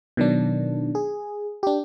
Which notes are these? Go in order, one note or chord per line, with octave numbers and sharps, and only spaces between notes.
B2 D#3 F#3 D4
G#4
D4 G4